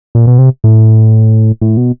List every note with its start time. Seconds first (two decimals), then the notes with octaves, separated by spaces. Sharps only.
0.15 A#2
0.27 B2
0.38 C3
0.64 A2
1.62 A2
1.77 B2